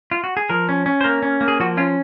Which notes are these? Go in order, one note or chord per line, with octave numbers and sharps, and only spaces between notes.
F4
F#4
G#4
F3 A#4
C#4
C#4
C5
A#3 A#4
C#4
A#3
G#4
F3 F#4
C#4 F4